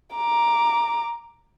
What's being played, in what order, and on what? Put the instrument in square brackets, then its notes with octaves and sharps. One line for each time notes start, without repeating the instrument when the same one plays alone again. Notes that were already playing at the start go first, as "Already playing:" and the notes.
[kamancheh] A#5 D6